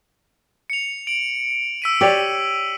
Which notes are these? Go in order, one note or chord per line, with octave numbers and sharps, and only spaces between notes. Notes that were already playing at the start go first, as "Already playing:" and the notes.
C#7 F7
D7 F#7
E6 B6 D#7
G4 C#5 D5 F#7